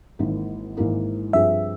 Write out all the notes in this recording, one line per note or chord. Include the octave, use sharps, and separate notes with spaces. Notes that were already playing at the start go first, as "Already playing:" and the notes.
G#1 G#2 E3 A#3 E4
G#1 G#2 E3 A#3 E4
G2 F3 C4 F4 G#4 E5